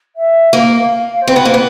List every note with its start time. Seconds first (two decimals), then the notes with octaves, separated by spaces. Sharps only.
0.16 E5
0.53 A#3 F5
1.21 C5
1.28 C4 B4
1.36 B3
1.45 A#3
1.54 B3